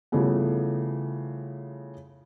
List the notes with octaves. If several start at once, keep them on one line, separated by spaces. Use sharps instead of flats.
C#3 E3 F3 G3 A3 B3